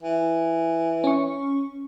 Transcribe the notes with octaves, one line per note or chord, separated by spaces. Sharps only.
E3
C#4 C#6